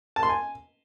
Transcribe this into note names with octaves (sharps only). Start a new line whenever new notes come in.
A5
C6
G#5